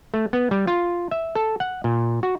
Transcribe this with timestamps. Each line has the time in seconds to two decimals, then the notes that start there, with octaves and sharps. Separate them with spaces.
0.14 A3
0.33 B3
0.51 G3
0.67 F4
1.11 E5
1.35 A4
1.60 F#5
1.84 A#2
2.23 F#4